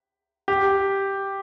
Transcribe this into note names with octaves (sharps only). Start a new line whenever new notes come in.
G4